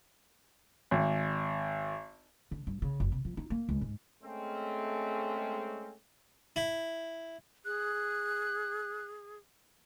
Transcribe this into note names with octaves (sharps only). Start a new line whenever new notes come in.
G#1
D3
G2
C#3
F#1
C3
F3
D#4
A#3
C#2
G#2
G#3 A3 C4 C#4
E4
G#4 F#6